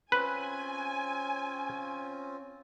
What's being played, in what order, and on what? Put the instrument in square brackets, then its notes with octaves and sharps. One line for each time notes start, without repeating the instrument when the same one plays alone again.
[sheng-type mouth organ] C4 C#4 F4 [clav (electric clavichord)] B4 [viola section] G#5